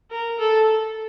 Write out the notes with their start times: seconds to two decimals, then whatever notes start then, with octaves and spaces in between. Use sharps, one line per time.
0.11 A#4
0.39 A4